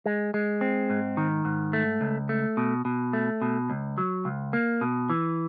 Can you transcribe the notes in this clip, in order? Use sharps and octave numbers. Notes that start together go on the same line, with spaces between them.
G#3
G#3
C4
G#2
D#3
G#2
A3
C#2
A3
B2
B2
A3
B2
C#2
F#3
C#2
A#3
B2
E3